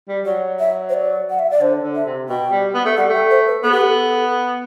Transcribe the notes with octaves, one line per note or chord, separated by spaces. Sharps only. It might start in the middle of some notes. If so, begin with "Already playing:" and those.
G3
F#3 D5
E5
C5
D5
F#5
E5
D5
D3 C5
D3
E5
C3
B2 G5
G3
B3
A3
G3 F#5
A3 G5
C5
B4
B3 A4
G4
A4